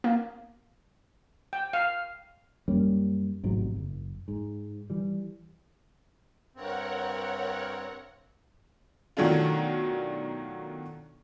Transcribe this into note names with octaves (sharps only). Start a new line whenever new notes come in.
A#3
G5
F5
F#2 G3 A#3 C#4
A1 G#2 C3 F#3
F#1
G#2
E3 G3
G2 C4 A#4 C#5 F#5
B2 D#3 F#3 A3 D4 F4